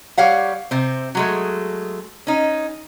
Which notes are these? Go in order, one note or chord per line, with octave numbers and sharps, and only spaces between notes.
G3 C#5 F5 F#5
C3 C4
F#3 G#3 A3
C#4 D#4